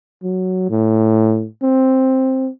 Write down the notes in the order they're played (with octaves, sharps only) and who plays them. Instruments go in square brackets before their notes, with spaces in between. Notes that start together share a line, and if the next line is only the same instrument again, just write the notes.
[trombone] F#3
A2
C4